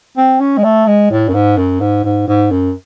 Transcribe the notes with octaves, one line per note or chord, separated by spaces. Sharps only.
C4
C#4
G#3
A3
G#3
A2
F#2
G#2
F#2
G#2
G#2
G#2
F#2